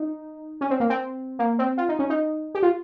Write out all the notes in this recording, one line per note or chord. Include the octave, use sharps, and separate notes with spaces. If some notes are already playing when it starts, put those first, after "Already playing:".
Already playing: D#4
C#4
C4
A#3
C4
A#3
C4
F4
D#4
C#4
D#4
G4
F4